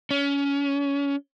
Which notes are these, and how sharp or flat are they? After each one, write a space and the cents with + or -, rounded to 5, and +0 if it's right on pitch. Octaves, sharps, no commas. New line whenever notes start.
C#4 +25